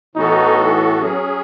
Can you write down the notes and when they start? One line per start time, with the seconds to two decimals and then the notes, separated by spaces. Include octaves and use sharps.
0.15 A2 E3 B3 D#4 F#4 A4
1.01 F#3 C#4 G#4